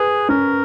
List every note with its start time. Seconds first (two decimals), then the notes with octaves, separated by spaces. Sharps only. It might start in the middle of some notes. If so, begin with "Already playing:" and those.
Already playing: G#4 B4
0.29 C#4 A#4